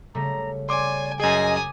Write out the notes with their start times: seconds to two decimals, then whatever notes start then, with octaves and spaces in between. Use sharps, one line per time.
0.15 C#3 G3 A3 A#5
0.69 C#5 D5 G#5 C6 D6
1.20 F#2 G#4 D#5 G#5 D#6